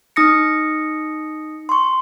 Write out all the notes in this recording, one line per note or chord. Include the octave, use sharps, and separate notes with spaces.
D#4 D#6 A#6 C#7
C6 C#6